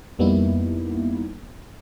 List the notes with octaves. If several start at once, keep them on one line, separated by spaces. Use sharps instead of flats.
F2 G3 A#3 B3 D#4 E4